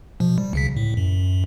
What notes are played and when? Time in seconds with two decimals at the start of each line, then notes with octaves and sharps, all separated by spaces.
0.20 B2 F3
0.38 G3
0.53 C#2 C#3 B6
0.77 A2
0.97 F#2